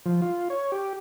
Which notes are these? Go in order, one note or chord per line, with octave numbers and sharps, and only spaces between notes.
F3
F4
C#5
G4